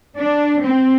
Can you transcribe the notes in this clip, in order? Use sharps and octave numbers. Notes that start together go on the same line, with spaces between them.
D4
C4